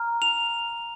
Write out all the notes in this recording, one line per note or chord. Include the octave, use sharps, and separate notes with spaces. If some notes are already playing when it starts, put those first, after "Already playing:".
Already playing: A#5 F6
F7